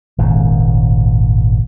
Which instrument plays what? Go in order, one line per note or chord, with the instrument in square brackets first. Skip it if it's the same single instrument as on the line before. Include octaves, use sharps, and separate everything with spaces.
[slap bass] D#1 G#1 G#2 C#3